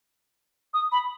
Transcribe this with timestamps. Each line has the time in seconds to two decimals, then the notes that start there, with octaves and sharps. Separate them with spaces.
0.74 D#6
0.92 B5